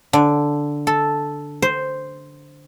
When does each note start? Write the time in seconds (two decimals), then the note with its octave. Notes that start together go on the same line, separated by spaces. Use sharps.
0.13 D3
0.87 A4
1.62 C5